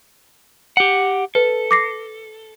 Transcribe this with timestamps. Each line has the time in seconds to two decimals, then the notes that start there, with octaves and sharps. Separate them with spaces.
0.77 G4 F#5
1.35 A4 B4
1.71 D6 A#6 C7